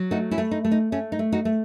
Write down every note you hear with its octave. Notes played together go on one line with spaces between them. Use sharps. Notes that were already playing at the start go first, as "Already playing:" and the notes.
Already playing: F#3
A3 D#4 F#4
C#4 E4
A3
D#4
A3
D#4
A3 C#4
D#4
A3
D#4 F#4
A3